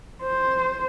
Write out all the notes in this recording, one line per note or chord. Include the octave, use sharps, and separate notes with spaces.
C5